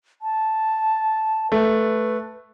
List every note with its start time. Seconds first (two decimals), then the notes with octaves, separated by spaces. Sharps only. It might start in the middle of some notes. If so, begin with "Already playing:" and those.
0.22 A5
1.52 A3 B4